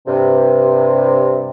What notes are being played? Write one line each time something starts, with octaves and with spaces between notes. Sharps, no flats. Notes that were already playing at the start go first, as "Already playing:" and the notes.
G2 C3